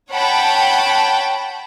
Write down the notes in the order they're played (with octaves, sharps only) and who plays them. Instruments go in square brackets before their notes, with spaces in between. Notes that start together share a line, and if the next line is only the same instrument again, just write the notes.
[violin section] C#5 F#5 G5 A5 B5